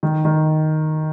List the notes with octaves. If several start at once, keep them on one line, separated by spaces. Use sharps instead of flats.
D#3
D#3